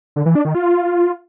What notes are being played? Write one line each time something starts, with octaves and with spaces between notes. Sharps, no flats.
D3
E3
D4
D#3
F4